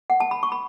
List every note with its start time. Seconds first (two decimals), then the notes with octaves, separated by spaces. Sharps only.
0.10 F#5
0.20 A5
0.31 B5
0.43 C#6
0.52 B5